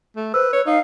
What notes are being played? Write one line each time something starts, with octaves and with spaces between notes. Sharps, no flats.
A3
B4 C5 E6
B4 C#5
D#4 F5